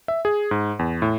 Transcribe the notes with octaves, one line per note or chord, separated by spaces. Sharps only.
E5
G#4
G#2
E2
A2